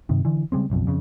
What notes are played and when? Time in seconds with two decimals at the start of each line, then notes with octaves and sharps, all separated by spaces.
0.09 G2 C3 D#3
0.25 D3 E3
0.52 C#3 G3 G#3 C4
0.70 F#1 B1 F2
0.87 F2 C#3